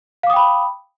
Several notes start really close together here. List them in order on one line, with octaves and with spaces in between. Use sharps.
F5 D6 D#6 G5 B5